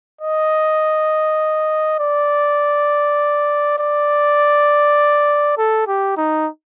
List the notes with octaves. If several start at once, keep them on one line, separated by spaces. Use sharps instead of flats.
D#5
D5
D5
A4
G4
D#4